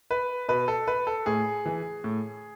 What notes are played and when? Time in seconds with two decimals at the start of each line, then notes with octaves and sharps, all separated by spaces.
0.11 B4
0.49 B2 B4
0.68 A4
0.88 B4
1.07 A4
1.26 A2 G#4
1.66 E3
2.04 A2